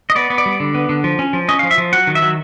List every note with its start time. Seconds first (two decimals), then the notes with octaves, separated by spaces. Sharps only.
0.10 D#5
0.16 B3 D5
0.30 B3
0.38 D5
0.46 G3
0.60 D3
0.74 B3
0.89 D3
1.04 F3
1.19 C#4
1.33 F3
1.49 C#4 D#5
1.59 F5
1.63 F3
1.71 E5
1.78 F3
1.93 F#3 F#5
2.07 D#3
2.15 E5
2.22 F#3